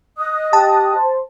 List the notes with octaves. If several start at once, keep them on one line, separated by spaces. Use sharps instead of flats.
D#5 D#6 F#6
G4 A5
C5